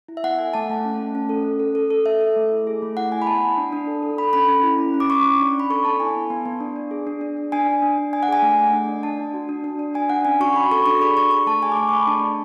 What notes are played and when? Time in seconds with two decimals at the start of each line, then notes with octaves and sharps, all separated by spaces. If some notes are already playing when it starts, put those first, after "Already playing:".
0.08 E4
0.17 E5
0.23 B3 F#5
0.38 A4 G#5
0.54 A3 A5
0.69 A3
0.85 C#4
0.99 A3
1.15 C#4
1.29 A4
1.45 C#4
1.60 A4
1.75 A4
1.91 A4
2.06 A4 E5
2.21 A4
2.36 A3
2.51 E4
2.67 G#4
2.82 A3
2.97 E4 F#5
3.12 E4 G#5
3.22 B5
3.27 B3 A5
3.42 E4
3.57 D4
3.72 D4
3.87 A4
4.03 A4
4.18 A4 B5
4.33 C#4 B5
4.48 C#4
4.63 E4
4.78 C#4
4.94 C#4
5.00 D6
5.10 C#4 C#6
5.24 C#4
5.39 D4
5.55 D4 B5
5.70 A4 C#6
5.85 B3 A5
6.00 E4 G#5
6.16 B3
6.30 B3
6.46 B3
6.60 D4
6.76 D4
6.91 G#4
7.07 D4
7.21 D4
7.37 D4
7.52 D4 G#5
7.67 D4
7.82 D4
7.98 D4
8.13 D4 G#5
8.23 F#5
8.29 G#4 G#5
8.43 A3
8.59 A3
8.73 D4
8.89 D4
9.03 D4 A5
9.19 D4
9.34 F#4
9.49 D4
9.64 D4
9.79 D4
9.94 D4 G#5
10.10 D4 F#5
10.25 C#4 G#5
10.40 F#4 C#6
10.55 F#4 B5
10.71 A4 C#6
10.86 D4 C#6
11.01 G#4 B5
11.17 D4 C#6
11.31 G#4 C#6
11.46 A3 A5
11.61 G#4 G#5
11.72 D6
11.77 A3 C#6
11.89 C#6
11.93 A3 B5
12.07 D4 A5
12.22 D4